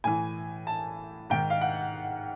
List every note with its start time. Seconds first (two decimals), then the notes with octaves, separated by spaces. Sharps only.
0.04 A2 E3 G#5
0.67 A5
1.30 G#2 D#3 G5
1.50 F5
1.61 F#5